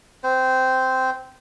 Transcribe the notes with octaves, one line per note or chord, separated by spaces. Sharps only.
C4 C5